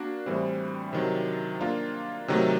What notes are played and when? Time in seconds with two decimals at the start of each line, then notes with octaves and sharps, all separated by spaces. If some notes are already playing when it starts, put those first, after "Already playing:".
Already playing: A#3 D4 F#4
0.26 A2 E3 G3 C4
0.93 C3 D#3 F#3
1.61 A#3 D4 F4
2.28 C3 D#3 F#3 A3